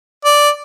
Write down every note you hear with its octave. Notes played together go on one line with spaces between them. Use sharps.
D5